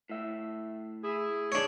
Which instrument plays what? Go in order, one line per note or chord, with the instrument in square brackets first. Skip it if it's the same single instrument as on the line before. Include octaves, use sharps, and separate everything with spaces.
[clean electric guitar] A2 E5
[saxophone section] E4 G#4
[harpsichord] D4 C#5 [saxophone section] G#4